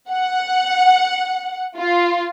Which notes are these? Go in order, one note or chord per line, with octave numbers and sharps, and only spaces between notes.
F#5
F4